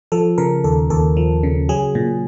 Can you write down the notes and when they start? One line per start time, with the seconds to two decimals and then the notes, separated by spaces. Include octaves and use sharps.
0.12 F3 A4
0.38 C#3 A#4
0.64 D#2 A4
0.90 D#2 A4
1.17 F3
1.43 C#3
1.69 F#3 G#4
1.95 A#2